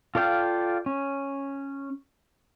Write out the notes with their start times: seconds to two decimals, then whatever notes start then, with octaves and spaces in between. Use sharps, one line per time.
0.15 F4 A4 D5 F5 G5
0.86 C#4